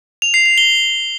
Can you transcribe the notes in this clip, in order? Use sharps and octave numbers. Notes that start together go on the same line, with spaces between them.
F7
C7
F7
G7